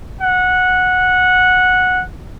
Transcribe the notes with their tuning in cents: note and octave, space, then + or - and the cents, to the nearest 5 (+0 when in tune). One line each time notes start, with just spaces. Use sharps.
F#5 -10